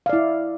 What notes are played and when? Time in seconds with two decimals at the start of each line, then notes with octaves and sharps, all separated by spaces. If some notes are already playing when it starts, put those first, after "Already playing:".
0.06 F5
0.09 D5
0.13 E4